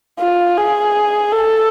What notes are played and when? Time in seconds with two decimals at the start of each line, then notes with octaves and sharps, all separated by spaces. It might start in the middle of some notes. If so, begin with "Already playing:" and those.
0.19 F4
0.57 G#4
1.32 A4